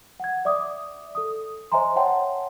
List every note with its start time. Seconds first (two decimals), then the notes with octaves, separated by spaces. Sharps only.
0.20 F#5 G#6
0.45 D5 E5 D6 D#6
1.15 A4 D#6
1.72 C5 D#5 E5 G#5 A#5 C6
1.96 C#5 E5 F#5 G5 A5 C6